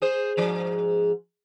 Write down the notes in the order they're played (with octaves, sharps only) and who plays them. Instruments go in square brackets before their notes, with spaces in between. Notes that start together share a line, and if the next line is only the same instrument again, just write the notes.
[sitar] G#4 C5
G#2 F3